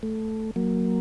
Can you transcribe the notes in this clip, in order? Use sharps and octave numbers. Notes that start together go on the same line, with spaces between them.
A3
F#3 A#3